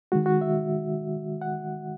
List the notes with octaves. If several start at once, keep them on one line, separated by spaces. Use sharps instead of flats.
D#3 G#3 F#4
F#4
E5
F#5